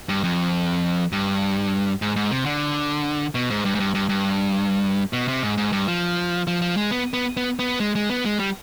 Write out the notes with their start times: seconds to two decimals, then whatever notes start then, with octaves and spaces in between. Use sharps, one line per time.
0.09 G2
0.24 F2
1.12 G2
2.02 G#2
2.16 G#2
2.31 C3
2.46 D3
3.35 B2
3.50 G#2
3.65 G2
3.75 G#2
3.80 G2
3.95 G2
4.09 G2
5.13 B2
5.28 C3
5.43 G#2
5.57 G#2
5.72 G2
5.88 F3
6.47 F3
6.62 F3
6.77 G#3
6.91 B3
7.14 B3
7.37 B3
7.59 B3
7.80 G#3
7.95 G#3
8.10 B3
8.25 G#3
8.40 G3